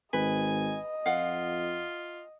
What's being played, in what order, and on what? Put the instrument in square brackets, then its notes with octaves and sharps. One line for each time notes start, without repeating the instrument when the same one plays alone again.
[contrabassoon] G#1 [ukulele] B4 [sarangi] D#5 [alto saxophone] G#5
[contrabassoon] F2 [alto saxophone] F4 [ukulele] F5 F#5